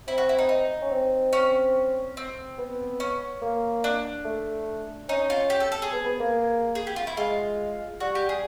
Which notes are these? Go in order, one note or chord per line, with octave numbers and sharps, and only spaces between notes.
C4 E4
F#4
E4
D#4
D#4
C#4
C4
C#4
C4
B3
C#4
A#3
D4
A3
C#4 D#4
F4
G4
A4
A4
G#4
B3
B3
A#3
G#4
G4
F4
E4
G#3 F4
G3 F#4
G4
G#4